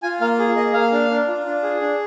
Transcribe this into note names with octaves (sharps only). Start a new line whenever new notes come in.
F4 G#5
A#3 F5
G#4
A#3 D#5
A#3 F5
D4
D4
F4
D4
G#4
D4